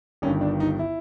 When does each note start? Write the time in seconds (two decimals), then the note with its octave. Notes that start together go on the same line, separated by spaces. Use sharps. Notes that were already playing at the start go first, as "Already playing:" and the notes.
0.22 G1 G2 D#3 C#4
0.41 D4
0.60 D#4
0.79 E4